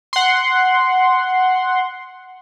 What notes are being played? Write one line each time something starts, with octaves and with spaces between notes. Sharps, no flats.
F#5 C6